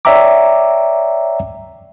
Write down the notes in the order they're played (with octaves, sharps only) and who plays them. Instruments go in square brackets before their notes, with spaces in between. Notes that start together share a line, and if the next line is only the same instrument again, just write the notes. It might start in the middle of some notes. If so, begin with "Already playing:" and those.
[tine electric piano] C#5 D5 E5 G5 A#5 D6